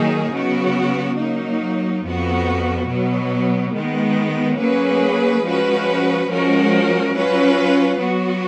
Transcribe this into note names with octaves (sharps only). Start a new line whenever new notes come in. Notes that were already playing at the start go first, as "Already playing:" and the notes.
Already playing: D#3 F#3 A#3 D#4 G#4
C#3 F#3 B3 F#4
F#3 A#3 D#4
F2 F3 B3 F#4
B2 F#3 B3
D#3 G#3 B3
F#3 A#3 C#4 G#4 B4
F3 G#3 C#4 F#4 B4
F3 G#3 C#4 F#4 A#4
F#3 C#4 F4 B4
F#3 B3 F#4